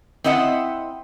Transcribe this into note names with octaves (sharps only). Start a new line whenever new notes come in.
C4 E4 D#5 E5 F#5